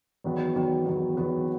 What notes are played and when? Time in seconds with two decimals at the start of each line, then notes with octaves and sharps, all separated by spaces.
0.24 E2 D#3 F#3 B3
0.55 E2 D#3 F#3 B3
0.86 E2 D#3 F#3 B3
1.17 E2 D#3 F#3 B3